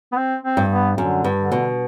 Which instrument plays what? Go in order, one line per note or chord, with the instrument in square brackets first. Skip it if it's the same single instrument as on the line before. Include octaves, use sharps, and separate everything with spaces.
[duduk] B3
C4
C4
[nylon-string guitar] G2
[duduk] B3
[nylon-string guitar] F#2 [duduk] D3
[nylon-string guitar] G2
[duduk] D3
[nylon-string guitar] B2